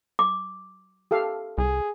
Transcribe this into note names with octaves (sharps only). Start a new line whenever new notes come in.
D6
G4 A4 F5
C2 G#4